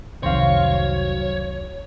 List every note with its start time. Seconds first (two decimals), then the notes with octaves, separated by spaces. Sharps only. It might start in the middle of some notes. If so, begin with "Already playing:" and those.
0.23 C2 F2 D#3 F#3 C4 C#5 F5